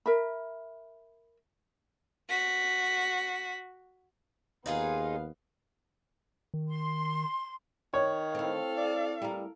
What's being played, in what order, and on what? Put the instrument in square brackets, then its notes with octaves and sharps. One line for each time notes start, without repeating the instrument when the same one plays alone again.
[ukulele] A#4 E5 B5
[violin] F#4 B6
[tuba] D#2 [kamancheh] B3 F5 [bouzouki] D#4 F4 G#4
[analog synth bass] D#3
[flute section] C6
[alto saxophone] D#3 [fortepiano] C#5
[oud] C4 E4 [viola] A4 F5
[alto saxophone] D5
[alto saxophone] G3 [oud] E4 A#4